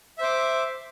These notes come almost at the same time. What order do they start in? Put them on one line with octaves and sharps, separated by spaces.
E5 C5 D6